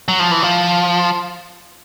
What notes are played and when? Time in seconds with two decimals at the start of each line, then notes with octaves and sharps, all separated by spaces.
0.08 F#3
0.19 F3
0.31 E3
0.42 F3